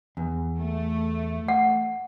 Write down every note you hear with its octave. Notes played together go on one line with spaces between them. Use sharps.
E2
A3
F#5